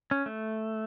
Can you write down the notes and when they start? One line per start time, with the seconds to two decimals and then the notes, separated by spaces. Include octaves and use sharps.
0.11 C#4
0.26 A3